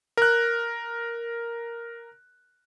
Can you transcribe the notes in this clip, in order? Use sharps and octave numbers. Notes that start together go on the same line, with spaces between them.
A#4 F#6